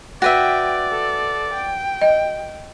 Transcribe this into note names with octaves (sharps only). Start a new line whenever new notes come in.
F#4 B4 D5 E5 G5
A4
G5
D#5